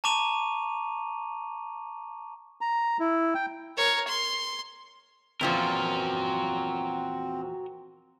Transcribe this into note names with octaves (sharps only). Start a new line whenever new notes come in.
A5 A#5 C#6 D6 D#7 F7
A#5
E4
G5
A#4 C#5
C6
E2 A#2 F3 C4 F#4 A#4